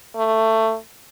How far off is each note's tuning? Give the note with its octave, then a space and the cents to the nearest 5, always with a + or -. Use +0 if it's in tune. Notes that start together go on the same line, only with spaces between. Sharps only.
A3 +15